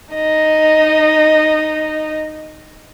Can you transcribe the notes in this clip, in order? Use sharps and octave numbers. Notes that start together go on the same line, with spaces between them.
D#4 D#5